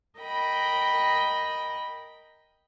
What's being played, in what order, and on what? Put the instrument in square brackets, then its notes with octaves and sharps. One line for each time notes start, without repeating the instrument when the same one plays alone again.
[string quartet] A#4 D#5 G5 B5